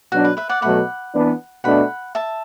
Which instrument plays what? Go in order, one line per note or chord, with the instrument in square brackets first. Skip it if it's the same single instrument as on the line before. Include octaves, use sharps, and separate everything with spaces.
[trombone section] B2 F#3 D4 [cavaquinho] F#4
[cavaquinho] B4
B4 E5
D5 F#5
[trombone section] B2 F#3 A3 [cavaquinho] F#5 B5
[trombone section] E3 B3 D4
[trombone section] B2 A3 D4 [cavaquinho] F#5 B5
[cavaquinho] E5 A5